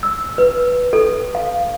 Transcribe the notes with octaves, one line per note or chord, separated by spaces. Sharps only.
E6
B4
A4
F5